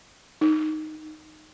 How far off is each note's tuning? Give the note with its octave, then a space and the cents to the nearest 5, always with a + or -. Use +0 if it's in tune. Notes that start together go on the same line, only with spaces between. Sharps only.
D#4 -5